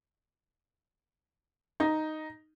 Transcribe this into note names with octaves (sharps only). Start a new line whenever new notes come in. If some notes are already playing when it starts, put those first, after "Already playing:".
D#4